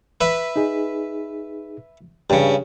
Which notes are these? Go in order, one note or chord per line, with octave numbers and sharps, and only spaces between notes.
B4 E5
D#4 G#4
G2 C#3 G4 C#5